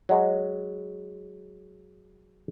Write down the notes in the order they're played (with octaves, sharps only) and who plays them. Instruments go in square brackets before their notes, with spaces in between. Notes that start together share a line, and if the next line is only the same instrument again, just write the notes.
[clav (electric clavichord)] F#3 G#3